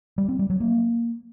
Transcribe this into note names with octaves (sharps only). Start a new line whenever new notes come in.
G3
C4
G3
F#3
A#3